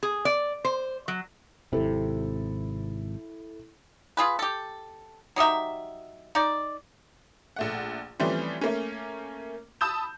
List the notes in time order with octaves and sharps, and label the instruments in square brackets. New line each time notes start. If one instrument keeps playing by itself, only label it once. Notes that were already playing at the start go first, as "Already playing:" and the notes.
[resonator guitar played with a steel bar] G#4
D5
C5
F#3
[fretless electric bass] G#1 C3 [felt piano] E4 A4
[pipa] F4 G#4 B4
G4 A4
F#3 D#4 G4 E5
D#4 D5
[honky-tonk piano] A#1 A3 F#5
E3 F3 G3 A3 C4 C#4
A3 A#3 C#4
A5 B5 D#6 E6 G6 E7